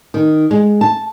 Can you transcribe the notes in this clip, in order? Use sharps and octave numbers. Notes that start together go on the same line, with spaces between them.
D#3
G#3
A5